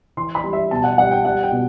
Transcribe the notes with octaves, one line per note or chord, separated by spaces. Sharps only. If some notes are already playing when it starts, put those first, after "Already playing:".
E3 C6
B5
G3
E5
B2 A5
F#5
G3 F#5
G5
G3 F#5
G5
B2